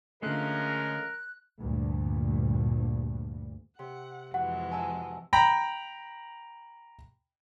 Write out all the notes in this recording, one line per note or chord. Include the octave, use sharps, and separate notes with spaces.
D3 F3 G#3 A3 C#4 A#4 F#6
D2 G2 A#2
C3 F#5
F2 E3 G#3 F#4 F#5
G#5 A5 E6
G5 A#5 B5